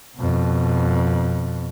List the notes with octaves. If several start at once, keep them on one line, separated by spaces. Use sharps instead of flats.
F2 B2